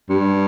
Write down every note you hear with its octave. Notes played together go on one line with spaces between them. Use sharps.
G2